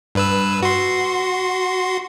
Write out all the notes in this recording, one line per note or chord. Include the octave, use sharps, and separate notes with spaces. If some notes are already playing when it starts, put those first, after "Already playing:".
G2 B4 E6
F#4 C6